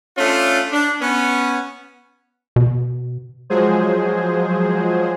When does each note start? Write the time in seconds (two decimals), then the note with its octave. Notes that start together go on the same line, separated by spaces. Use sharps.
0.18 A3 C#4 D4 F4
0.72 D4
1.01 B3 C#4
2.56 B2
3.50 F3 F#3 G#3 G#4 C5